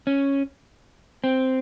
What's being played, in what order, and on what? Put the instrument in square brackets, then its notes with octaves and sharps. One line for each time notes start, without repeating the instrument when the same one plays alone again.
[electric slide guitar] C#4
C4